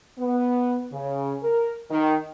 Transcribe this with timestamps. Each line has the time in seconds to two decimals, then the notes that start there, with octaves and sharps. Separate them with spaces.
0.19 B3
0.92 C#3
1.43 A#4
1.91 D#3